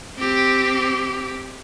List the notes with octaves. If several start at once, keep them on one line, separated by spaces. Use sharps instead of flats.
C4 G4